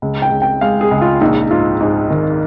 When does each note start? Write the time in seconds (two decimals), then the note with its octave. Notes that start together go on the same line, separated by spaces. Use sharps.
0.02 C#2
0.22 G5
0.32 C#2
0.42 G5
0.61 G#3 F5
0.81 G#4
0.91 C#2
1.01 F4
1.21 A#1 D#4
1.51 G#2 F4
1.80 G#2 G#4
2.10 D#3